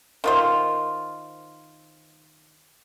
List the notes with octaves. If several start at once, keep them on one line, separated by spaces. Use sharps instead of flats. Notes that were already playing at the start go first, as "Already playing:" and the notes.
D#3 F4 C5